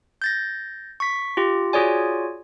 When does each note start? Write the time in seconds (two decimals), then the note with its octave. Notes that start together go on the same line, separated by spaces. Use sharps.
0.22 G6 A6 A#6
1.00 C#6 B6
1.37 F4 G4
1.73 F4 F#4 G#4 C#5 D5 G#5